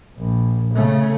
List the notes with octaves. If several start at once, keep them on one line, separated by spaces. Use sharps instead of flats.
A#1
C#3 A3